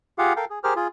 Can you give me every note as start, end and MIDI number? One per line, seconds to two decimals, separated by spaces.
0.18 0.33 65
0.18 0.33 67
0.18 0.33 68
0.18 0.33 77
0.18 0.33 78
0.36 0.45 69
0.36 0.45 70
0.36 0.45 77
0.36 0.45 79
0.50 0.59 68
0.64 0.74 67
0.64 0.74 68
0.64 0.74 70
0.64 0.74 72
0.64 0.74 89
0.76 0.88 65
0.76 0.88 68